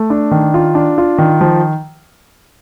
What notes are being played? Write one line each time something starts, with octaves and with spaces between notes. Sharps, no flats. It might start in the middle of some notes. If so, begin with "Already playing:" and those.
Already playing: A3
D4
D#3
F4
D4
F4
D#3
F3